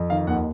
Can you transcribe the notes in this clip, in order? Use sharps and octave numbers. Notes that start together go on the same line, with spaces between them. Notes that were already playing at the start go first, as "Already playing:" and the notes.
Already playing: F2
D#3 F5
D#2 F#5